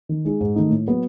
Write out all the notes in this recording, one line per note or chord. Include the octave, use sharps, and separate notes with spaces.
D#3
G#3 D#4 G#4
G#2
D#3 A3 D#4
A2
F#3 B3 F#4